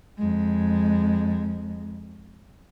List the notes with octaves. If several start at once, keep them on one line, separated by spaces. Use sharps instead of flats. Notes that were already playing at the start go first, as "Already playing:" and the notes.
F2 G#3